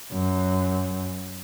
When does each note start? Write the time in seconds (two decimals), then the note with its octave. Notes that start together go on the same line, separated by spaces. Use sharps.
0.12 F#2